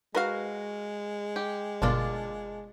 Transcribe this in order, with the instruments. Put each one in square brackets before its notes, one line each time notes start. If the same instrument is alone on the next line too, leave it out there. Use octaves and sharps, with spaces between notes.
[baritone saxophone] G#3 [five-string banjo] F#4 A#4 [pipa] B4 F5
[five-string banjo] G4
[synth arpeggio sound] G1 B2 [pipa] D3 A#3 D5 [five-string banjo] D4 F4